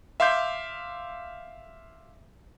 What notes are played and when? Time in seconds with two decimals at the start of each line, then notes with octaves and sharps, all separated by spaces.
0.20 E5 F5 C6 D6 G6